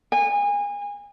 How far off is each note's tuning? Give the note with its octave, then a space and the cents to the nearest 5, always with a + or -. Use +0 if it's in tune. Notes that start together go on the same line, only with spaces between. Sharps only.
G#5 -30